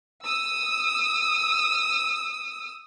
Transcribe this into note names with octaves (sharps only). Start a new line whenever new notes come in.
D#6 E6